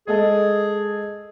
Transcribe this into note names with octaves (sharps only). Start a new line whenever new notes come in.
G#3 G#4 A4 D#5